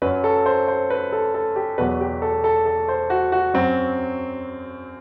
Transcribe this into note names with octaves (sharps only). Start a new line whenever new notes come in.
F#2 F#3 B4
A4
C5
C5
B4
A4
A4
G4
E2 B2 F#3 B4
G4
A4
A4
A4
C5
F#4
F#4
F#2 F#3 C4